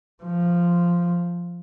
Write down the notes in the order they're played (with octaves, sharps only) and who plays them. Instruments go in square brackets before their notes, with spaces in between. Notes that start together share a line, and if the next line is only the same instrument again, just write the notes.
[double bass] F3